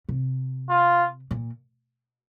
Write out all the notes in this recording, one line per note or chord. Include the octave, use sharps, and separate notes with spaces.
C3
F4
A#2